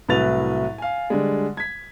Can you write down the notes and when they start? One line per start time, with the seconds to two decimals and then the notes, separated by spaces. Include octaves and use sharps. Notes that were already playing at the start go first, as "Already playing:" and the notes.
0.09 C2 A2 F#3 B4 A6 F7
0.78 F5 G#5
1.10 D3 G3 G#3
1.57 G#6 B6